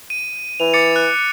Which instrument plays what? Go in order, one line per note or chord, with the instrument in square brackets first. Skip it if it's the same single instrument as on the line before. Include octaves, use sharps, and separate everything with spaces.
[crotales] D#7
[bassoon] E3 [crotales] F7
[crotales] D6 A6 C#7
F#6